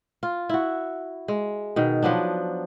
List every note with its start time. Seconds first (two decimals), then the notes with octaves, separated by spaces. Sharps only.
0.23 F4
0.49 E4 F#4
1.28 G#3
1.76 B2 D#3
2.02 F3 F#3 B3 D4